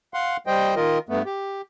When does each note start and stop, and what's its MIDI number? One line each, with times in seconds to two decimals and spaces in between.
0.14 0.37 77
0.14 0.37 78
0.14 0.37 84
0.47 0.75 55
0.47 0.75 72
0.47 0.75 75
0.47 0.75 79
0.76 0.98 51
0.76 0.98 65
0.76 0.98 70
0.76 0.98 75
1.09 1.22 43
1.09 1.22 57
1.09 1.22 59
1.26 1.62 67